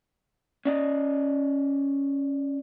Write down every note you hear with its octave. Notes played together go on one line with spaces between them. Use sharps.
C#4 D5 D#5